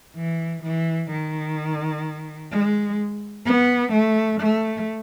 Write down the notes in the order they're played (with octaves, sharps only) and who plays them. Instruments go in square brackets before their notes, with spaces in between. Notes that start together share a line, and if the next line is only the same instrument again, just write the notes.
[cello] E3
E3
D#3
G#3
B3
A3
A3